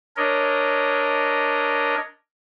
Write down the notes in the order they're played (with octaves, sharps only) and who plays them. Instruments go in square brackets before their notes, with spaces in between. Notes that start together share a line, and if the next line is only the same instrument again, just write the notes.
[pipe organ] D4 A#4 C#5 D#5